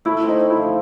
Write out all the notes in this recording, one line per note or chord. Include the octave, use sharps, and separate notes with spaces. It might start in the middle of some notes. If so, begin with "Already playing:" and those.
A3 E4
C4
D#4
C4
E4
F3